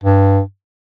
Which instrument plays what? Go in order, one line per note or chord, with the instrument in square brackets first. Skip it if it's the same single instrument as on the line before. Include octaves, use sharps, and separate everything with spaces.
[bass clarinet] G2